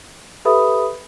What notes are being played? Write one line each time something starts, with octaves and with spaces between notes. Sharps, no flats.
G4 A4 B4 E5 B5 D#6